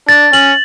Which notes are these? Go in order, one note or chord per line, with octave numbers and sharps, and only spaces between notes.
D4 A6
C#4 F#7